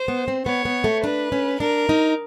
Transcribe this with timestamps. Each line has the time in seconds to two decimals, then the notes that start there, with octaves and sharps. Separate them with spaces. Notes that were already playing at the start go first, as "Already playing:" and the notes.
Already playing: C5
0.08 B3
0.28 C4
0.46 B3 C#5
0.65 B3
0.84 A3
1.04 D4 B4
1.32 C#4
1.60 D4 A#4
1.89 D#4